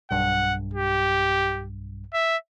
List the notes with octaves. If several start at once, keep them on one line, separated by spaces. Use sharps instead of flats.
B1 G2 F#5
G4
E5